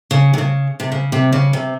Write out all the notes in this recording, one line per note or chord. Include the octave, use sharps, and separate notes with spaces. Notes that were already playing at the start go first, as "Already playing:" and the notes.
C#3
C3
C#3
C3
C#3
C3
C#3
C3